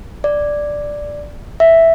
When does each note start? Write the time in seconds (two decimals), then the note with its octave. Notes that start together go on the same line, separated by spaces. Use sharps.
0.24 D5
1.60 E5